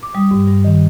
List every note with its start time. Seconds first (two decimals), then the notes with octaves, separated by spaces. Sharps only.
0.03 D6
0.14 G3 D#6
0.31 G2
0.47 G2
0.65 D#3